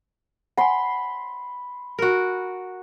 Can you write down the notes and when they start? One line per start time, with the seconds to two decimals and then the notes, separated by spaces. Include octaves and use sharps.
0.58 F#5 G#5 B5 C6
1.99 F#4 A#4